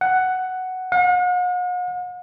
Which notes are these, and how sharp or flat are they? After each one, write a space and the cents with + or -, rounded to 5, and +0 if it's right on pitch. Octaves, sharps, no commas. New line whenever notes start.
F#5 +5
F#5 -45